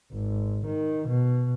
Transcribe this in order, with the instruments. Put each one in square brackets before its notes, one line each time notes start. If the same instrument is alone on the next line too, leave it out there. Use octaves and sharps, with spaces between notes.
[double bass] G#1
D#3
B2